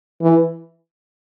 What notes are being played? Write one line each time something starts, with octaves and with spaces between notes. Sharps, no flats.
E3